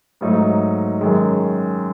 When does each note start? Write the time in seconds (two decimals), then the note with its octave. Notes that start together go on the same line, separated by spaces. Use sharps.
0.21 G#2 F#3 A3 D#4
1.01 F#2 D#3 G#3